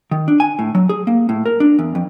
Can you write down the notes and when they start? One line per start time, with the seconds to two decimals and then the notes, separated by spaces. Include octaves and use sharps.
0.11 D#3
0.28 D4
0.40 G#5
0.59 A2
0.75 F#3
0.89 G#4
1.07 A#3
1.29 A2
1.46 A#4
1.60 D4
1.79 E2
1.95 F2